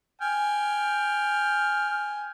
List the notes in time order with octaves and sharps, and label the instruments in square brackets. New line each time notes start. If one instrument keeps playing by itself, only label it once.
[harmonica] G5 G#5 F6